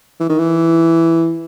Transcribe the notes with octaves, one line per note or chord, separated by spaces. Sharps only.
E3
D#3
E3